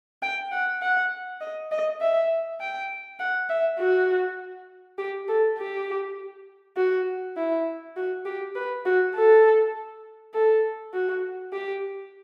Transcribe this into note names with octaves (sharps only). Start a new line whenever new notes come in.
G5
F#5
F#5
D#5
D#5
E5
G5
F#5
E5
F#4
G4
A4
G4
F#4
E4
F#4
G4
B4
F#4
A4
A4
F#4
G4